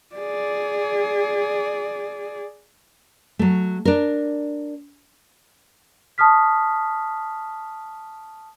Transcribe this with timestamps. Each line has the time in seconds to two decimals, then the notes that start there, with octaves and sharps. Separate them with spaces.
0.15 G#4 D5
3.39 F#3 A3
3.85 D4 A#4
6.18 A5 C#6 D#6 F6 B6